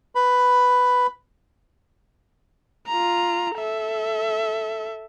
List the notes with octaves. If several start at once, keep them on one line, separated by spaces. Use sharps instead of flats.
B4 B5
F4 A#5
A4 E5